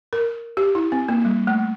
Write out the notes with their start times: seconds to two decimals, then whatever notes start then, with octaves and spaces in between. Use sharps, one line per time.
0.13 A#4
0.57 G4
0.75 E4
0.92 C4
1.08 A#3
1.25 G3
1.47 A3